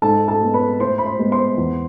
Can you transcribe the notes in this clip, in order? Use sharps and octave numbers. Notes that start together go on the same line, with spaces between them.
G#2 A4 A5
A4 A5
G#3 B3
B4 B5
A2 C5 C6
B5
C5 C6
G#3 B3
C5 C6
E2